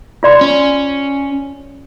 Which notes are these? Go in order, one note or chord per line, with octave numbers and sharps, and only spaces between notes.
F4 D5 C6
C#4